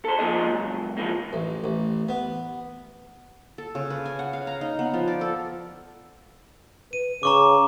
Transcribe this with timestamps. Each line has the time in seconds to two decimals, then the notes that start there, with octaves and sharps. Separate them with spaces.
0.05 A4 C5
0.19 F3 A3 A#3 F4 G#4 D#5
0.47 C#2 F#2
0.97 E3 F3 G#3 A#3
1.33 A1
1.64 A1
2.09 B3
3.58 A4
3.75 C#3
3.90 B4
4.06 G#5
4.19 F#5
4.33 F5
4.47 A#5
4.61 D#4
4.79 B3
4.94 F3
5.08 D5
5.21 A4
6.93 B4 D#7
7.23 C#3 A#5 C#6 D6